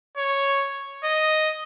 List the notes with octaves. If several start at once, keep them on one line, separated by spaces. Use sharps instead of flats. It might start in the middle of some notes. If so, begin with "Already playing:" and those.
C#5
D#5